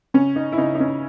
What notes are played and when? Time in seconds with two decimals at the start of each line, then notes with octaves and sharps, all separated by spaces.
0.14 C#3 C#4
0.36 D#4
0.52 E4
0.58 C#3 D#4
0.75 D#4
0.80 C#4